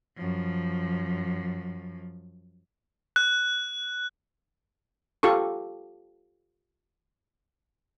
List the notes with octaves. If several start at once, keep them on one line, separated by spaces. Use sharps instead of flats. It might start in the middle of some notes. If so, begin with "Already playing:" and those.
F#2 F3
F#6
F4 G4 A4 C#6